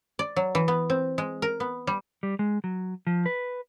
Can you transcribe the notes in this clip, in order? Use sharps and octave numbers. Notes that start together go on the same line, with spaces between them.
D5
F#3
E3
B3
C4
G#3
A#4
B3
G3
G3
G#3
F#3
F3
B4